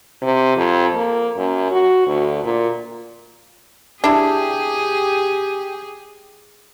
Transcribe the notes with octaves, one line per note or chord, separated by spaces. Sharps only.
C3
F2
A#3
F#2
F#4
D2
A#2
D4 E4 G4 G#4